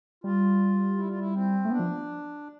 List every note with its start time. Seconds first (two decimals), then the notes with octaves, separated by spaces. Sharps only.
0.24 G3 F4
0.97 E4
1.08 F4
1.20 E4
1.34 C4
1.65 A3
1.70 B3 D4
1.79 F3